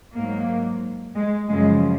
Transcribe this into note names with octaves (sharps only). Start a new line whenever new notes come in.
G#2 F#3 A#3
G#3
F#2 C#3 F3 G#3